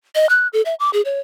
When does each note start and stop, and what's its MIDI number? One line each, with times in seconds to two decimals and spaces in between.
0.15 0.28 75
0.29 0.48 90
0.53 0.62 69
0.65 0.75 76
0.80 0.90 86
0.93 1.01 68
1.05 1.20 73